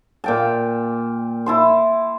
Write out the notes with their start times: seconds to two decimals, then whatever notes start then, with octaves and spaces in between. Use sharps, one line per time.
0.24 A#2 G5 A5
1.46 E4 A5 C6